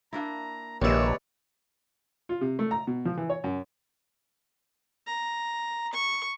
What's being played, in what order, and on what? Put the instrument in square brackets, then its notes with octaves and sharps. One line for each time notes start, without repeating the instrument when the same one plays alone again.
[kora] A#3 D4 E4 [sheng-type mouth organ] A#5
[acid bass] A#1 [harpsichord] D#2 E5 [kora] C3 G#3 [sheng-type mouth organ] B4 C#5 D5
[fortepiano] F4
C3
A3
A#5
B2
F3
E3
C#5
F#2
[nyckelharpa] A#5
C#6